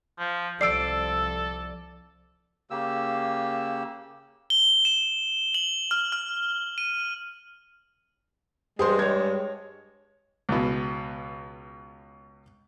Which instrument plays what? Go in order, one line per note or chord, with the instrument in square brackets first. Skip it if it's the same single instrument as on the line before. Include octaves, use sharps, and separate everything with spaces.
[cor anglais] F3
[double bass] C2 F3 [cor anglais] A4 [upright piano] D5 E6 [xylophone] C7 D7
[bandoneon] C#3 A#3 G4 E6
[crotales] G7
E7
F#7
F6
F6
D#7
[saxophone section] G2 G#3 [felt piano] G#4 C5 C6
[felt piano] C#5 G#6
[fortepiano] C#2 B2